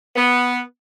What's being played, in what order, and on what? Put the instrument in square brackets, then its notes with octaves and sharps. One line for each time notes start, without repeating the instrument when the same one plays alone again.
[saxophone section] B3